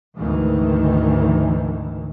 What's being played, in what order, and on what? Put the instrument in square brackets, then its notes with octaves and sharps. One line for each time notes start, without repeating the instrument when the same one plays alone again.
[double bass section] D2 G#2 D#3 E3